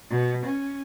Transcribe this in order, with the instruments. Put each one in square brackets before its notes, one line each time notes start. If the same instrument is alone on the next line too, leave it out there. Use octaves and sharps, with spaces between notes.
[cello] B2
C#4